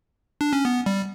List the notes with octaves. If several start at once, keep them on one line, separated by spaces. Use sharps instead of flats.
D4
C#4
B3
G3